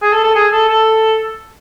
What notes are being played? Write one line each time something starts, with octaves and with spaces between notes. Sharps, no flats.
G#4
A4
A4
G#4
A4
A4